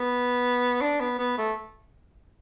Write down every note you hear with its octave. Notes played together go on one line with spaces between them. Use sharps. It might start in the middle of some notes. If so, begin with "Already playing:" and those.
Already playing: B3
D4
B3
B3
A3